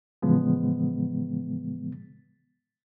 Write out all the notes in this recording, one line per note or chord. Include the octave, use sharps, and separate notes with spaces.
A2 C#3 E3 F3 G#3 B3